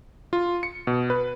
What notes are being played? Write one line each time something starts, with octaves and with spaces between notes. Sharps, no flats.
F4
C#7
B2
B4